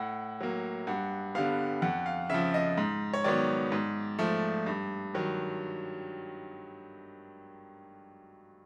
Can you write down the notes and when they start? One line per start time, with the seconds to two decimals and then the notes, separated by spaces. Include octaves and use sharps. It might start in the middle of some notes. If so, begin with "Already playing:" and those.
Already playing: A2 F#5
0.41 F#3 A#3
0.87 G2 F#5
1.35 D3 G3 B3 F5
1.82 F2 F#5
2.06 F5
2.30 C#3 F3 E5
2.54 D#5
2.78 G#2
3.14 C#5
3.24 D#3 F#3 B3 D5
3.72 G#2
4.19 F3 A3
4.66 G2
5.14 D#3 F#3